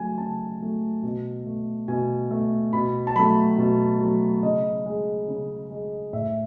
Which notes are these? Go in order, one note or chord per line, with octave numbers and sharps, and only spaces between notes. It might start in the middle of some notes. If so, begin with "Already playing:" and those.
Already playing: C#3 F#3 A3 G#5
C#3 A5
F#3 A3
B2
A3
B2 G#5
A3
B2 B5
A5
F#3 A3 B5
B2
F#3 A3
C#3 D#5
G#3
C#3
G#3
A2 E5